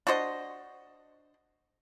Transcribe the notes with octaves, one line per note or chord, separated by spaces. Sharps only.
D4 F#4 C5 D#5